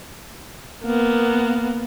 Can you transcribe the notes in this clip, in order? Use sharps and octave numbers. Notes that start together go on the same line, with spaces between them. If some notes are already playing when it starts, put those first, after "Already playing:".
A#3 B3